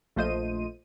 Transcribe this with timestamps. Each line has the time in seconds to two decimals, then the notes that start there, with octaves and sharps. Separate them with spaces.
0.16 A#1 A3 F4 C5 D#5 D#7